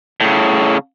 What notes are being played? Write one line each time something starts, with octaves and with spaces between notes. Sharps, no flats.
A2 C#3